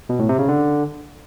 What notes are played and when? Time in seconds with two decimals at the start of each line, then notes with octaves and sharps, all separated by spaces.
0.09 B2
0.19 A2
0.29 C3
0.39 C#3
0.49 D3